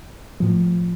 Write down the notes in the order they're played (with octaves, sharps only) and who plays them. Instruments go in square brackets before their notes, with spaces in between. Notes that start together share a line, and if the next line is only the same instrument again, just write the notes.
[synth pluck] A2 F3